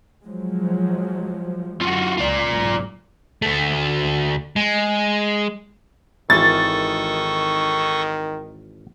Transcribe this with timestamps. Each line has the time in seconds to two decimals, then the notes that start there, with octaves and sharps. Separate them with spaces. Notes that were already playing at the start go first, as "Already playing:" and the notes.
0.24 F3 F#3 G#3
1.81 F#2 D3 F4 F#4
2.18 C#2 F4 D5
2.48 F#1 B1 G#2
3.42 D2 A3
4.56 G#3
6.30 G#1 D#3 E3 A4 C#6 D#6 A6